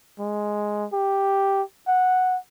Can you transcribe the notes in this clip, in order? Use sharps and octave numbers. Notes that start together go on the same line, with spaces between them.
G#3
G4
F#5